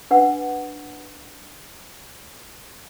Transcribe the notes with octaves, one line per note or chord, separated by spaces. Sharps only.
D4 B4 F#5